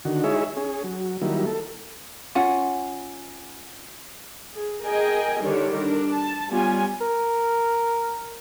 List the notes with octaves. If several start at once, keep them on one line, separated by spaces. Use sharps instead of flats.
D3 D#3 F#4
G#3 D#4 E4 G#4 C#5 E5
C#4 G#4
F#3
D#3 F#3 G3 A#3 E4
A4
C#4 F4 F#5
G#4
G#4 A#4 D#5 G5 G#5
D3 D#3 G3 D4 C#5
D4 A#4
A5
G3 B3 C#4 F4 G#5
A#4